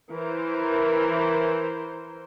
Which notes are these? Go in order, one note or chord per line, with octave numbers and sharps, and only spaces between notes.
E3 A#4 C5